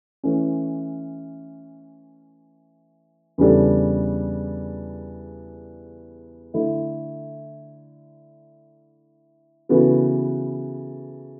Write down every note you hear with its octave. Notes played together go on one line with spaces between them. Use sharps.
E3 A3 C#4
E2 C#3 G3 D4 A4
D3 A3 E4
C#3 E3 B3 F#4 A4